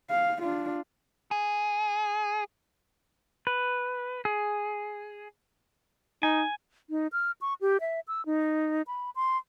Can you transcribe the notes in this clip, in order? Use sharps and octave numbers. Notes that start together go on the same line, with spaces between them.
F5
D4 F4
G#4
B4
G#4
D#4 G#5
D#4
F6
C#6
G4
E5
E6
D#4
B5
C6